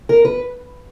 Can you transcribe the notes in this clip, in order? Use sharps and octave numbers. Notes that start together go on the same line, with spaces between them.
A#4
B4